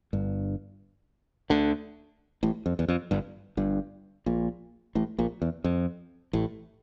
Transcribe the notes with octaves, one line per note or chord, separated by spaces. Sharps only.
G1 G2
D2 D3
A1 A2
F2
E2
F2
G1 G2
G1 G2
A#1 A#2
A1 A2
A#1 A#2
E2
F2
A1 A2